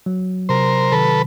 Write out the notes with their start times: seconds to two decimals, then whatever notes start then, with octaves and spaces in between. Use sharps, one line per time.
0.06 F#3
0.49 C3 A#4 C5
0.92 D#3 A4 B4